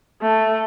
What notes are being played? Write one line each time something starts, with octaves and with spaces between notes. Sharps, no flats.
A3